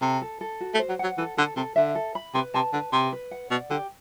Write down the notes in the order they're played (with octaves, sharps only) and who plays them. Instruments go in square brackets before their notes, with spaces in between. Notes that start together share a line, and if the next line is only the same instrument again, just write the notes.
[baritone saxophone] C3 [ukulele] A4
[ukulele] A4
A4
F#4
[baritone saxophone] A3
[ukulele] C5
[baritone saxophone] F#3
[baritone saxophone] F#3 [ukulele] F#5
[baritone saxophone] E3 [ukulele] A4
[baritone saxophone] D3 [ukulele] A4
[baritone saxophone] C3 [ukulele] A4
[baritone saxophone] D3 [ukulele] E5
[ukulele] A4
B5
[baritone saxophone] C3 [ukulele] B4
[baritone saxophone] C3 [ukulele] A5
[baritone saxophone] D3 [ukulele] B4
[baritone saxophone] C3 [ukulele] B4
[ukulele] B4
F#5
[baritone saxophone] B2 [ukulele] D5
[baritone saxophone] D3 [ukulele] G4